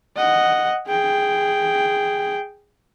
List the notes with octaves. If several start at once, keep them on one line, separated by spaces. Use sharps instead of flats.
D#5 F#5
G#4 G5